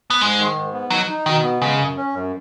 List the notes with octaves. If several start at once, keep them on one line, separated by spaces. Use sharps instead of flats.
B3
G#2 G#3
D#3
G#2
B3
F#3 D#4
D#4
B2 D#3
B3
C#3 G#3
F#2
C#4
F#2